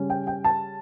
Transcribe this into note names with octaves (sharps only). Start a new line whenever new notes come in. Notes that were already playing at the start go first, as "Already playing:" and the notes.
Already playing: C#3 G3 C#4
G5
G5
A5